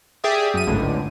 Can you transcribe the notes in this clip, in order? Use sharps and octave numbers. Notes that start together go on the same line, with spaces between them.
G4 G#4 D5 E5 D#6
F#2 D#7
G#1 C#2 A2 D3